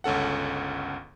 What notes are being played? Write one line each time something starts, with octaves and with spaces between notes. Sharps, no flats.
G1 C#2 C#4 A4 F#5